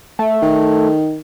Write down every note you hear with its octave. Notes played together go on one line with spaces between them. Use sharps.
A3
D#3